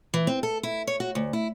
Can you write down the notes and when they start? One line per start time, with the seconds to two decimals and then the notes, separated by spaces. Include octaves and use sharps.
0.14 E3
0.27 C4
0.43 A4
0.63 E4
0.87 C#5
1.00 F#4
1.15 D2
1.33 E4